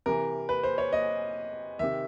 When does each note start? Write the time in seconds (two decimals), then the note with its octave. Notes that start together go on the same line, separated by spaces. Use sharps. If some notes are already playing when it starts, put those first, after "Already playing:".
0.06 C3 E3 A#4
0.49 B4
0.63 C5
0.78 C#5
0.93 D#5
1.79 C3 D#3 E5